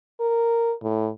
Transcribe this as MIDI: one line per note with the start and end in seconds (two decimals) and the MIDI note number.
0.20 0.74 70
0.83 1.10 45